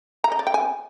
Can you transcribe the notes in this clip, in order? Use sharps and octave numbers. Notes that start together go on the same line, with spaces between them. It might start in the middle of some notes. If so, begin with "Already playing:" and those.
A#5
D#5
D5
G5
G#5